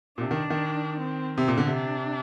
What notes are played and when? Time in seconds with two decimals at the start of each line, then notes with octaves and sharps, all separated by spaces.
0.18 A#2
0.21 C3 D4
0.31 D#3
0.50 D#3
0.99 C4
1.38 C3 C4
1.48 A#2
1.58 D3
1.67 C3
1.76 D4